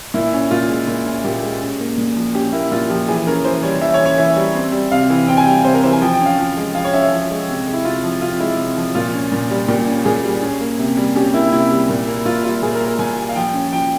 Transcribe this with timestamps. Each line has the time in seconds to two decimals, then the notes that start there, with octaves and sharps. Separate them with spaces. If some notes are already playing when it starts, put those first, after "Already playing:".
0.14 A#2 E4
0.33 C#4
0.51 A#2 F4
0.69 G#3
0.88 A#2
1.06 C#4
1.25 A#2 G4
1.43 G#3
1.61 C#4
1.80 A#3
1.98 A#2
2.16 F3
2.35 C#4 G4
2.52 A#3 E4
2.72 A#2 F4
2.90 F3 G4
3.08 E3 G#4
3.27 C#4 A#4
3.44 E3 C5
3.63 G3 C#5
3.81 E3 E5
3.94 C#5
4.00 C#4
4.06 C#5
4.18 E3 E5
4.37 G3
4.55 C4
4.73 G3
4.92 C3 F5
5.10 E3
5.28 C4 G5
5.37 G#5
5.46 G3 G5
5.65 C3 C5
5.74 A#4
5.84 E3 C5
5.92 G#5
6.01 F3 G5
6.14 G5
6.21 C#4
6.26 F5
6.38 F3
6.57 G#3
6.75 F3 F5
6.85 C#5
6.93 C#4 E5
7.02 C#5
7.12 F3
7.31 G#3
7.48 C3
7.67 G#3
7.73 E4
7.85 C3 F4
8.03 F3
8.21 C3 F4
8.40 G#3 E4
8.58 C3
8.77 F3
8.95 A#2 F4
9.14 C#4
9.32 A#2
9.50 G3
9.69 A#2 G4
9.87 C#4
10.06 A#2 G#4
10.24 G3
10.42 C#4
10.61 A#3
10.79 C3
10.97 G3
11.15 C#4 G4
11.34 A#3 E4
11.52 C3 E4
11.71 G3
11.89 A#2
12.07 A#3
12.26 A#2 F4
12.44 G3 F4
12.63 A#2 G#4
12.75 A#4
12.81 A#3
12.87 A#4
12.99 A#2 G#5
13.18 G3
13.29 F5
13.36 F3 G5
13.54 C#4
13.73 F3 G5